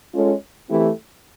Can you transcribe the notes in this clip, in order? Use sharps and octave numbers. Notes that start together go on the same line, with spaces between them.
G#3 C#4 F4 A4 C#5
E3 A3 C4 E4 G4